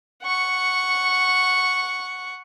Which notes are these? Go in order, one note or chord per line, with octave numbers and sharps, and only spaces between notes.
F#5 C#6